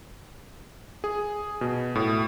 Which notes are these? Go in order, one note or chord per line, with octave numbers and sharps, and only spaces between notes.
G#4
B2
A2